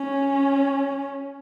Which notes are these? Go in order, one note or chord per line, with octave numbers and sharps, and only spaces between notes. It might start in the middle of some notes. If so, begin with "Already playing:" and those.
Already playing: C#4